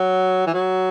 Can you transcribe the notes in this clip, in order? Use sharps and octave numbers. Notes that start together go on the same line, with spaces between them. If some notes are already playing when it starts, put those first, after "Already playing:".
Already playing: F#3
E3
F#3